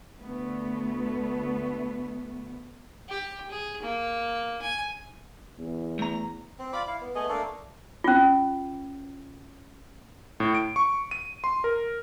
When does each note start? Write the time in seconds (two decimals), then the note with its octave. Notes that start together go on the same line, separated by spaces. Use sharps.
0.19 D2 A3 B3
3.09 G4
3.51 G#4
3.83 A#3
4.62 G#5
5.59 E2
5.99 A3 A#5
6.59 C4
6.73 F4 D5 B5 D6
6.87 E4 F5
7.01 B3
7.15 A3 B3 G#4 D#5
7.29 A3 A#3 D4 A4
8.04 C#4 F4
10.40 A2
10.55 D7
10.76 C#6
11.11 D#7
11.44 C6
11.64 A#4